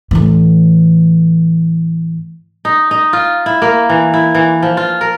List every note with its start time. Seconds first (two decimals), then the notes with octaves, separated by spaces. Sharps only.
0.11 A2 E3
2.65 D#4
2.91 D#4
3.13 F4
3.46 E4
3.62 A#3
3.89 E3
4.14 E4
4.35 E3
4.62 F3
4.77 F4
5.01 A#4